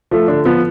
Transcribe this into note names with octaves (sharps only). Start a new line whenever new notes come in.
F3 A3
D3 D4
F3 B3